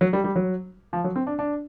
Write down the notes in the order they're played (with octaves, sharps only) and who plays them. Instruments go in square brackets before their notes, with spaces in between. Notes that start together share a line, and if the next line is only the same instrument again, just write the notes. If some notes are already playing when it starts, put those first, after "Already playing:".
[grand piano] F#3
G3
G3
F#3
F3
F#3
C4
D4
D4